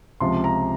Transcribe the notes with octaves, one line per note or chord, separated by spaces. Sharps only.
C#2 C3 F3 C6
A#5